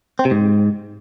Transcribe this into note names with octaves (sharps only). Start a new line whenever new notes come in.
C4
C3
G#2